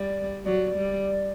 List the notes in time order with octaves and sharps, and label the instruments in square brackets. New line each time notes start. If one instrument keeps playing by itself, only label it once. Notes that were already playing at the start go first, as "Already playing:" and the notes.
Already playing: [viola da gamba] G3 [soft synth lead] D5
[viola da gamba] F#3 [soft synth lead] D5
[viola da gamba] G3